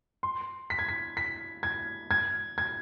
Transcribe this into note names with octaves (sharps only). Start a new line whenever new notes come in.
C6
B6
G#6
B6
B6
G#6
G#6
G#6